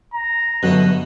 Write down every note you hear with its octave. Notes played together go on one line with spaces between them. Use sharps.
A#5
G1 B2 F#3 A3 B3 F#6 D#7